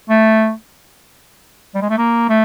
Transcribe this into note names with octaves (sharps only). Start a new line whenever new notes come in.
A3
G3
G#3
A3
A#3
A3